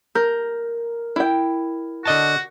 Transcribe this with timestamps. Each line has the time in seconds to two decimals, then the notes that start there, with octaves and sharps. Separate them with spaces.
0.15 A#4 G6
1.16 E4 G5
2.06 D3 F#4 D#5 A5